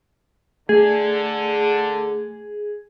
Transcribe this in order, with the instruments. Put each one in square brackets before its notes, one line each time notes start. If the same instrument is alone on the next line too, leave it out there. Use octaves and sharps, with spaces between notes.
[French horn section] D3 [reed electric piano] A3 [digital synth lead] G#4